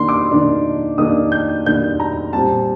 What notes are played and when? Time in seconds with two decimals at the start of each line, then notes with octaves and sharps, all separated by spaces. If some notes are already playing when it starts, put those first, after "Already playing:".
Already playing: D#3 A#3 D4 C6
0.09 D6
0.31 D#3 A#3 D4
0.98 D#3 A#3 D4 D#6
1.32 G6
1.66 D#3 A#3 D4 G6
2.00 A#5
2.33 A#2 G3 C4 A5